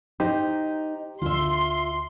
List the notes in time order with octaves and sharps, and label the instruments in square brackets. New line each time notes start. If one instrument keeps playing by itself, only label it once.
[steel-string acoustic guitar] D#4 [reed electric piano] G4 C5
[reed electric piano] D2 [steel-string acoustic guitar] F4 E5 [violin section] C6